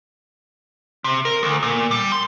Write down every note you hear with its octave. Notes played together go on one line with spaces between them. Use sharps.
C3
A#4
D2
A#2
G3
C6